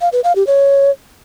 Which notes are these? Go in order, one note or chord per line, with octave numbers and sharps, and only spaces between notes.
F5
B4
F5
G4
C#5